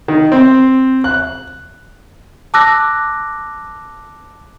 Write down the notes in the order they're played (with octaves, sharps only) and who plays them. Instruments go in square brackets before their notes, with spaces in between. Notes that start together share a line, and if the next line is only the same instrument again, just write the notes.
[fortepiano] D#3
C4
F#6
[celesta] A5 D6 E6 F#6 A#6